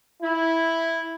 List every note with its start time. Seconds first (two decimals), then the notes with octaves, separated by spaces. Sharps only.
0.21 E4